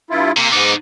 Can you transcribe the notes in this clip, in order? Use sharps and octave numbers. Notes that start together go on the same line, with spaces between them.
G2 E4 F4
C3 A#3
G#2 B3 D#4 D6